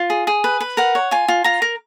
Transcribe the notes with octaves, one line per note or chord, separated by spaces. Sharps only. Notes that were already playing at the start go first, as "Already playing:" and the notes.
Already playing: F4
G#4
G#4
B4
B4
A#4 F#5
C#5
F4 G#5
F4
F4 A#5
A#4